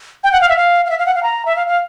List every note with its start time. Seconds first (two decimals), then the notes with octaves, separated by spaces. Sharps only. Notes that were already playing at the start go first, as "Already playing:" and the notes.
0.23 G5
0.32 F#5
0.41 F5
0.49 E5
0.57 F5
0.85 F5
0.90 E5
0.98 F5
1.06 F#5
1.15 F5
1.23 A#5
1.45 E5
1.56 F5
1.67 F5